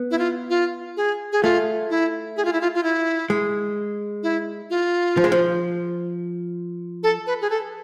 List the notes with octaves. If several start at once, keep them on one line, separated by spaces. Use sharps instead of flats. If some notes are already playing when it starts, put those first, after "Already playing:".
Already playing: B3
E4
F4
F4
G#4
G#4
A3 F4
E4
G#4
F4
E4
F4
F4
E4
G#3
E4
F4
F3
G#3
F3
A4
B4
G#4
A4